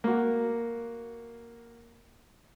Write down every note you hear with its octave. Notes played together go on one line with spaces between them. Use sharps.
A#3 F#4